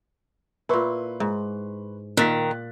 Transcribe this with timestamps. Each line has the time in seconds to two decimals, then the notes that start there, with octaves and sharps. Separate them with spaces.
0.69 A#2 E4 B4 C6 C#6
1.20 G#2
2.17 A#2 D#3 F#6 A6 B6